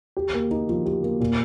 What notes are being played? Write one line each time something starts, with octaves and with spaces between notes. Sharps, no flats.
G4
A#3
D#4
F3
G4
A#3
A#2